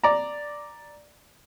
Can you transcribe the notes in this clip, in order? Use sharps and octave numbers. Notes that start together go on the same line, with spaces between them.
D5 A#5